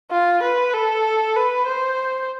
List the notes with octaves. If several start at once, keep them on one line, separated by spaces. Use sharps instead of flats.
F4
B4
A4
B4
C5